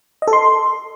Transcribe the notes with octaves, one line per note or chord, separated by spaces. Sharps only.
D#5
A4
C6